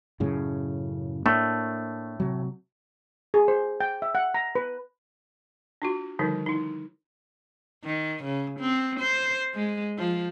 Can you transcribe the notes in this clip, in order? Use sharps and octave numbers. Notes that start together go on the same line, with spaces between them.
F#2 A2 C#3
A2 A3 A#3 D4
C3 F#3
G#4
C5
G5
E5
F#5
A#5
B4
D4 F4 F#4
D3 D#3 F3 G3 D#4
D#4 E4
D#3
C#3
C4
C5
G#3
F3